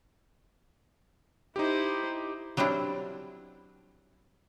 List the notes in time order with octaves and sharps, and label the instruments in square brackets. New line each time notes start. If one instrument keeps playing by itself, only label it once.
[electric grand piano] D#4 G4 [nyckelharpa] E4 C5
[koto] F#3 G3 C4 D4 E4